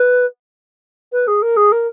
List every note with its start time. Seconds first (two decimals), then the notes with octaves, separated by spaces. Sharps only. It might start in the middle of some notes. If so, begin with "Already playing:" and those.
Already playing: B4
1.12 B4
1.27 G#4
1.42 A#4
1.57 G#4
1.72 A#4